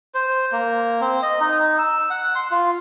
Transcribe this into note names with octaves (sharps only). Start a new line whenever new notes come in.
C5
A#3
C4
D#5
D#4
E6
F#5
C6
F4